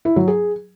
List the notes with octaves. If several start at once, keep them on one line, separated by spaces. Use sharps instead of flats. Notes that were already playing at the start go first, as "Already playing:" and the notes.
E4
F#3
G#4